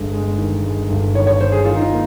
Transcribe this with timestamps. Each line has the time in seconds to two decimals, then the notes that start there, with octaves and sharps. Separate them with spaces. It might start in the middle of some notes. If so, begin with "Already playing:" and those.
Already playing: G1 G#3
0.13 G#3
0.38 D#3
0.63 G#3
0.90 G1
1.14 D#3 C#5
1.27 C#5
1.41 G#3 C5
1.52 G#4
1.65 D#3 F4
1.75 D#4
1.82 F4
1.91 A#3